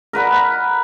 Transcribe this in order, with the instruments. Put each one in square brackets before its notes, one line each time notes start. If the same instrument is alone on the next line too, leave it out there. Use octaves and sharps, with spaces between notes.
[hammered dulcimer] A#4 B4 F#5 B5